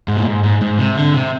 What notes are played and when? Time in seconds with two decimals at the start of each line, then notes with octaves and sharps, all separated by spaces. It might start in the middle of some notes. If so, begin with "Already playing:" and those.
0.08 G#2
0.17 A#2
0.26 G#2
0.43 G#2
0.61 G#2
0.79 C3
0.97 D3
1.14 C3